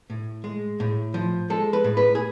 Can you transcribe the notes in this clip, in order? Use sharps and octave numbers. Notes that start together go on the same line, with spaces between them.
A2
G#3
A2
F3
G#3 A4
B4
A2
B4
G#4